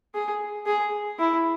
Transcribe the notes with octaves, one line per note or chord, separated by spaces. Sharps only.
G#4
G#4
E4